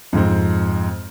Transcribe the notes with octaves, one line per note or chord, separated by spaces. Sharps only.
F2 G#2 C4